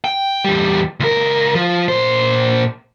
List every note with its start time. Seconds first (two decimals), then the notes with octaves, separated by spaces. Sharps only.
0.04 G5
0.45 E2 G3
1.00 C#2 A#4
1.55 F3
1.88 A#2 C5